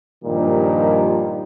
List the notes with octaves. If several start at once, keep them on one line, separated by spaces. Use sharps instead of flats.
G2 A#2 D#3 F3 G3